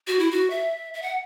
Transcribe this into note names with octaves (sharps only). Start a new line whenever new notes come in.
F#4
E4
F#4
E5
E5
F#5